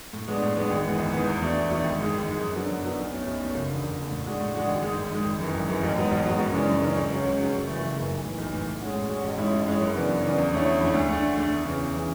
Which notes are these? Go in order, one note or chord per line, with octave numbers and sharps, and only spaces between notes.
A2
G#3 B3 D4
A2
G#3 B3 D4
G#1
G#2 E3 B3
G#1
G#2 E3 B3
E2
B2 A3 D4
E2
B2 A3 D4
G#1
G#2 G#3
G#1
G#2 G#3
F#2
D3 F#3 B3
F#2
D3 F#3 B3
B1
B2 A3 C#4
B1
B2 A3 C#4
F#1
E2 D3
F#1
E2 D3
A2
G#3 D4 F#4
A2
G#3 D4 F#4
G#1
G#2 G#3
G#1
G#2 G#3
G#1
F#2 E3
G#1
F#2 E3
A1
G#2 F#3 B3
A1
G#2 F#3 B3
F#2
C#3 E3 G#3 D4
F#2
C#3 E3 G#3 D4
C#2
C#3 F#3 C#4
C#2
C#3 F#3 C#4
F#1
F#2 E3 A3
F#1
F#2 E3 A3
B1
A2 E3
B1
A2 E3
A2
G#3 C#4 F#4
A2
G#3 C#4 F#4
A1
G#2 G#3 C#4 E4
A1
G#2 G#3 C#4 E4
F#2
C#3 E3 B3 D4
F#2
C#3 E3 B3 D4
E2
D3 A3 C#4 E4
E2
D3 A3 C#4 E4
D2
D3 A3
D2
D3 A3
E2
C#3 E3
E2
C#3 E3